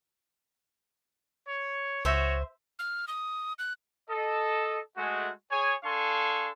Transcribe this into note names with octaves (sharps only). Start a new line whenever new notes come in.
C#5
C#2 F#4 C5 C#5 E5
F6
D#6
F#6
A4 D#5
G#3 A3 F#4
G#4 C#5 G#5
D4 A4 F5 G#5 C6 C#6